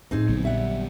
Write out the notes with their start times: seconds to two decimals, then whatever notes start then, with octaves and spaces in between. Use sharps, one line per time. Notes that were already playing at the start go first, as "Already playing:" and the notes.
0.11 A2 F#3 C4 D#4 G#4
0.28 A#1 D3 F#3 B3
0.43 G3 E5 F#5